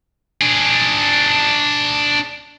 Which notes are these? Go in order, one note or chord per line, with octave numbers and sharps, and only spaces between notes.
D4 G#4